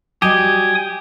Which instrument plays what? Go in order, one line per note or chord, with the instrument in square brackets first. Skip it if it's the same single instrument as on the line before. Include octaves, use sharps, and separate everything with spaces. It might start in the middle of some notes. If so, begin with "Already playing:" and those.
[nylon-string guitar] F#3 G3 D#5 [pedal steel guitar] G4 [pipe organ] G#5 D#6